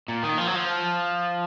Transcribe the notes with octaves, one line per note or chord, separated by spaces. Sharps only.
A#2
D#3
F3
F#3
F3